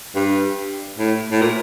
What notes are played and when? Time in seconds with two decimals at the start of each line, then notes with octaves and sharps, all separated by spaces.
0.15 G2
0.99 A2
1.32 A2
1.42 A#2